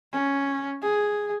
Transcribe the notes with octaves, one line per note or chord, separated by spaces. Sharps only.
C#4
G#4